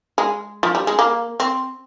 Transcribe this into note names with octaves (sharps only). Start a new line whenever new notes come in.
G#3
F3
G3
G#3
A#3
C4